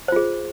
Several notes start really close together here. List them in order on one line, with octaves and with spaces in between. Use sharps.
C5 F4 G#4